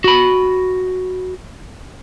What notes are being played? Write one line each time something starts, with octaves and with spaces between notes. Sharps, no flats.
F#4 B5